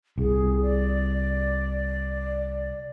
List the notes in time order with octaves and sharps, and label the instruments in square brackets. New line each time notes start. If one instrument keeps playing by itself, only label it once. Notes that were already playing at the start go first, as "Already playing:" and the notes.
[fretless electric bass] C2 [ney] G#4
[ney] D5